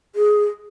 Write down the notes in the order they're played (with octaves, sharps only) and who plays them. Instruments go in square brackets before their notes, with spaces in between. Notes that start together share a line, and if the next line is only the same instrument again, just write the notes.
[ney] G#4